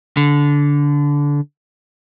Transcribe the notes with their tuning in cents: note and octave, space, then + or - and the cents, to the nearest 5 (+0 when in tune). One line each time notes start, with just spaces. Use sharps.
D3 -20